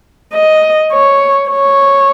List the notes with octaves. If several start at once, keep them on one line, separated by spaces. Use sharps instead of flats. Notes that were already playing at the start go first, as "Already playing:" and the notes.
D#5
C#5
C#5